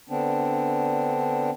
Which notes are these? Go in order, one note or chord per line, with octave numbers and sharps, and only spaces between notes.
D3 B3 C4 D4